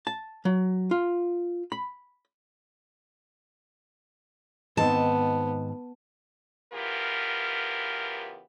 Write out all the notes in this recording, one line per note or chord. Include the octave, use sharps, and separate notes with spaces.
A5
F#3
F4
B5
G#2 D#3 B3 C4 A5
C#3 E3 B3 F4 G4 A#4